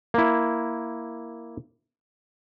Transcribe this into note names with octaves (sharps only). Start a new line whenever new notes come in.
A#3 E4